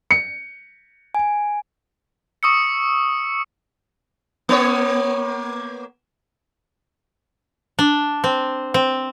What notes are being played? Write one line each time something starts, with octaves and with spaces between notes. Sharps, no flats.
C#7
G#5
C#6 D#6 E6 C#7
A#3 B3 C#5
D4
C4
C4